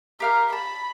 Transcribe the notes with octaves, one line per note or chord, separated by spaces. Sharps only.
G4 A#4 F5 F6
A5 B5